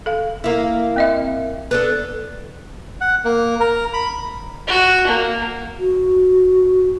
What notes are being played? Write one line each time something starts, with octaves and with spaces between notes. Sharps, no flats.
A4 F5
A#3 E4
C4 D#5 E5
B3 D4 A4
F#5
A#3
A#4
B5
F#4
A#3
F#4